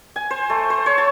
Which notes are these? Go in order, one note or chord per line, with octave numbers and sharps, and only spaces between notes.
G#5
C5
A3
C5
C#5
A5